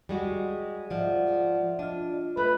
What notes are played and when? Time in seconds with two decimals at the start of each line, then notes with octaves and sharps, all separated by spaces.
0.09 G3 G#3 F#4
0.90 G#2 F3 D5 E5 F#5
1.79 D4 F4 D#5
2.37 A3 B4